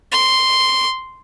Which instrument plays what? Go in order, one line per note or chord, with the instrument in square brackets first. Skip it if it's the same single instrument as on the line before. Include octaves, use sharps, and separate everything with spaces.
[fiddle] C6